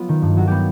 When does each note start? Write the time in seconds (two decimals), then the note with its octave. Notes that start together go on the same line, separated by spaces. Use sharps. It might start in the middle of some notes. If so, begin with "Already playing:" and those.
Already playing: F#3 B3 F4
0.09 D#3
0.22 G2
0.37 F#3 F#4
0.48 B3 G4